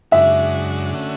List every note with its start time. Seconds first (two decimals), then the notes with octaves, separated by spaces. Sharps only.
0.12 F#2 C#3 G#3 D4 F#4 E5
0.93 D3 A3 C#4 F#4